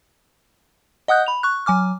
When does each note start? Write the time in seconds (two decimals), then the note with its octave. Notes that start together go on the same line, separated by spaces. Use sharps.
1.08 D#5 F#5 D#6 F#6 G6
1.27 B5 F7
1.43 C#6 F#6
1.66 F#3 G#5 D6 F6